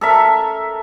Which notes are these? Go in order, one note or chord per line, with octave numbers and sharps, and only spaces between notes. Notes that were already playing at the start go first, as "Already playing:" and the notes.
A4 A#4 E5